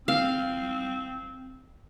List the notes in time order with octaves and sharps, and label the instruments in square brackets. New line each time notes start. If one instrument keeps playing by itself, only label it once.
[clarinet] C4 [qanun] F5